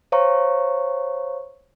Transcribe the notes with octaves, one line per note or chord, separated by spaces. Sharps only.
C5 C#5 F5 A#5 C#6